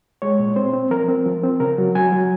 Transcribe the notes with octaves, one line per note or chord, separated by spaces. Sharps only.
G#3 C#5
A#2
C4 C5
C4
F3 A#4
C4
F3
C4
C#3 A#4
F#3
F#3 G#5
F#3